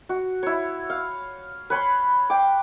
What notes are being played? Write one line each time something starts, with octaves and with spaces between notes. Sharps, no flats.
F#4
E4 C#5
F5
B4 C#5 B5 C6
G5 D6